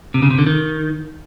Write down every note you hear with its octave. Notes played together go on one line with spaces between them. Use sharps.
C3
C#3
C3
D3
D#3